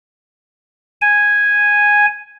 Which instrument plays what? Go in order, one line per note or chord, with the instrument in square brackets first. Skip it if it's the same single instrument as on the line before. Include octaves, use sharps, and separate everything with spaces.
[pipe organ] G#5